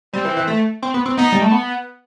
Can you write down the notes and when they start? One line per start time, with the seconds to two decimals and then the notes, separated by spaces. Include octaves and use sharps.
0.13 G3 C4
0.25 E3
0.37 E3
0.47 A3
0.82 C4
0.94 B3
1.06 C4
1.17 B3 D#4
1.32 G3
1.42 A3
1.51 B3